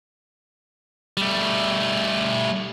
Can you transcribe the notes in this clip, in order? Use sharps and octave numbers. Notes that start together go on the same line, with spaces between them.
G3 A3